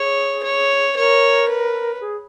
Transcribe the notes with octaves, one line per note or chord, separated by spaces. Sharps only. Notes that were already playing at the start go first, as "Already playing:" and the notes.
Already playing: G#4 C#5
C#5
A#4 C#5
B4
G#4